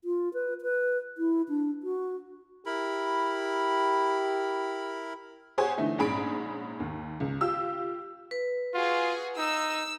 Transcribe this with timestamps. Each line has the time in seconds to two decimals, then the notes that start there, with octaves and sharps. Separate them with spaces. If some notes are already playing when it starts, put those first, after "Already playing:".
0.04 F4
0.34 B4
0.62 B4
1.18 E4
1.49 D4
1.83 F#4
2.66 E4 G4 A#4 B5
5.58 G4 G#4 C5 C#5 F#5 G#5
5.77 D3 E3 A3 D#4
5.98 A#1 G#2 C#4 G#4 B5 D7
6.80 D#2
7.20 C#2
7.41 F4 G4 E6
8.31 B4
8.74 F4 F#4 G#4
9.38 D#4 E6